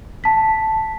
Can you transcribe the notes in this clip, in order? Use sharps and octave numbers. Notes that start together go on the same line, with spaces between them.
A5 B6